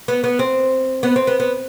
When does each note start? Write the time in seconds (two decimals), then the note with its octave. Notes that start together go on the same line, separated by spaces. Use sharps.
0.08 B3
0.24 B3
0.39 C4
1.03 B3
1.16 C4
1.27 B3
1.40 B3